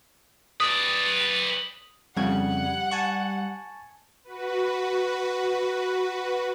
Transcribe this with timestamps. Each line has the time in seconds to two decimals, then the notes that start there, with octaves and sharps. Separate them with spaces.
0.60 B4 D5 D#6
2.17 F2 C#3 G3 F#5 G#6
2.92 G#5 A5 C#6
4.24 F#4 B4